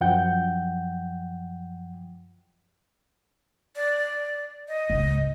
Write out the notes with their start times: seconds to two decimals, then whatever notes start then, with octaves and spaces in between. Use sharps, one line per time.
0.01 F#2 F3 F#5 G5 G6
3.76 D5
4.68 D#5
4.90 C#2 G#2